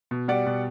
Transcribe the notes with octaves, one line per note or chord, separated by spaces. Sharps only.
B2
G3 D5 F#5
B2